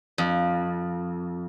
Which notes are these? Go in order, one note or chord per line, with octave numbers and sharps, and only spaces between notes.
F2